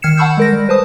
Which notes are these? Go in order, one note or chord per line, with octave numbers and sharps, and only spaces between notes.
D#3 F6 G#6 C7 C#7 E7
F#5 A5 B5 C#6 E6 G6
G#3 A#4 A#6
G3
B4 C5 A5 D#6